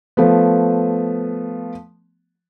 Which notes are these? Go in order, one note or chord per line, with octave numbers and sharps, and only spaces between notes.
F3 A3 B3